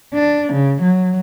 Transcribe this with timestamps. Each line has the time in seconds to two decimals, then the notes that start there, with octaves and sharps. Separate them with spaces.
0.14 D4
0.53 C#3
0.81 F#3